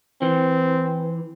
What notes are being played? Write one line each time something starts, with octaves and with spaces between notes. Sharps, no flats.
E3 C4